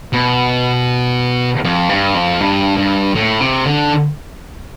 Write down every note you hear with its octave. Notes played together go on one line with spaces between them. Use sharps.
B2
F2
G2
F2
G2
G2
A2
C3
D3